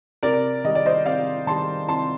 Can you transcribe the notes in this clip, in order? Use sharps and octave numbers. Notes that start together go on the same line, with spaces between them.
C3 A#4 D5
D#3 G3 D#5
D5
C5 D#5
C3 D5 F5
D#3 G3 A5 C6
C3 A5 C6